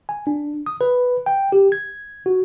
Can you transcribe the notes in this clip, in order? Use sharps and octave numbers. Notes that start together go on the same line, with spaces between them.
G#5
D4
D#6
B4
G5
G4
G#6
F#4